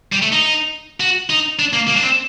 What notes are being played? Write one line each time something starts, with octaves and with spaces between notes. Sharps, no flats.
G3
A3
D#4
F#4
D#4
D4
A#3
A#3
D4
C4